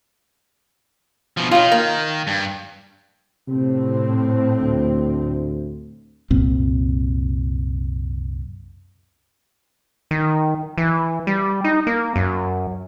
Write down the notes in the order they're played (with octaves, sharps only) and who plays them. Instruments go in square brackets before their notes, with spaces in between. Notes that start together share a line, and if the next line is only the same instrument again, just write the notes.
[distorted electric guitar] B2 F3
[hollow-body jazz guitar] B1 F4 [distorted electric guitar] D#3
[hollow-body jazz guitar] A#3
[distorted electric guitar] G2
[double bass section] A2 C4 [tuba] C3
[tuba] D2
[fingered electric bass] C2 F#2 A#2 C4
[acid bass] D#3
E3
G3
D#4
A#3
F#2